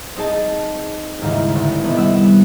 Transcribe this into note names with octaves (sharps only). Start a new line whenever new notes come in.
C4 D#4 G#4 A5
D#2 G#2 C#3 E3
A1 D3 C#5
C3 D#3 E3 A3 B3
G3 E5 F#5